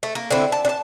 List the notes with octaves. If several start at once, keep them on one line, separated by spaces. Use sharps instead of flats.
A3
A#3
D3 C4 E4
A5
D4 A5